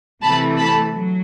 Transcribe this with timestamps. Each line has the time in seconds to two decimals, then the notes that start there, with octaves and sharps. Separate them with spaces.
0.23 C3 E3 A3 A5 B5
0.58 A5 B5
0.93 F#3